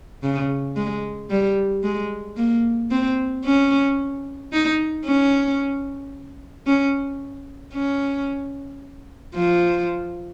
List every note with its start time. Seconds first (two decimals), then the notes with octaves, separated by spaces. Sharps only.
0.23 C#3
0.76 G#3
1.30 G3
1.83 G#3
2.37 A#3
2.91 C4
3.45 C#4
4.52 D#4
5.05 C#4
6.66 C#4
7.74 C#4
9.35 F3